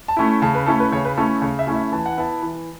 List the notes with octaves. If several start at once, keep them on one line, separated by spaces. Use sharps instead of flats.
A5
A3 C#4 E4
C#3 A5
B4
A3 C#4 E4 A4
B4
C#3 C#5
B4
A3 C#4 E4 A4
C#3 C#5
E5
A3 C#4 E4
E5
E3 A5
F#5
B3 E4 A5
E3